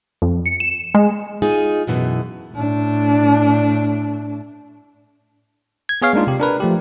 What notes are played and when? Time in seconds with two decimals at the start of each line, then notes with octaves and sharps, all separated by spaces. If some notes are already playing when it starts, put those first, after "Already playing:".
0.22 F2
0.46 C#7
0.60 E7
0.95 G#3
1.42 D#4 F4 G#4
1.87 F#2 B2 E3
2.54 A2 D4
5.89 G#6
6.02 B3 G#4 C#5 F5
6.13 G#3 A#3 D4 D#4 F4
6.27 C3 G4
6.40 D4 A#4 B4
6.60 F3 A3 G4